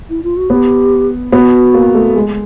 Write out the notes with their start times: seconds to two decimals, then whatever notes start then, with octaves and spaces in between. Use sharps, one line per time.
0.10 E4
0.23 F4
0.37 F#4
0.50 B3 G4
1.32 B3 F#4
1.74 A#3
1.95 A3
2.16 G#3